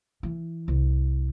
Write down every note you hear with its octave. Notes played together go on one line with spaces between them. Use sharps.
E3
C2